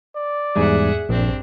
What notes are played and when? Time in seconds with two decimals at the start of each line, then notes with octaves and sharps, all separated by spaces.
0.16 D5
0.56 E2 G#2 G3 G#4 E5 F#5
1.09 A#1 G2 C4 D4